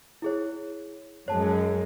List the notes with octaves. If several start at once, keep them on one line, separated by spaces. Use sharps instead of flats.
E4 G#4 C#5
F#2 G#3 C#5 A5